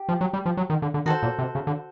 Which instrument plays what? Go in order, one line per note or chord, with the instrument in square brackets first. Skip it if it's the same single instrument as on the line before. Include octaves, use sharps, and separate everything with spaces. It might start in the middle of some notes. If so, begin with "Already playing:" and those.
Already playing: [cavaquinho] G4
[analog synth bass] F3
F#3
G3
F3
F#3
D#3
D3
D3
[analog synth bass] D#3 [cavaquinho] F#4 A4 C5
[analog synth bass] A#2
C3
C#3
D3